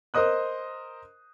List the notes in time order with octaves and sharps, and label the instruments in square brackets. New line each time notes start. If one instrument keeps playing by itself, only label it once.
[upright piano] A#4 C5 D#5 D#6 F#6